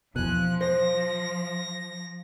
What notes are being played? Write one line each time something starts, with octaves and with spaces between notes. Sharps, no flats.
E2 B2 F3 G#5 F#6
C5 A#6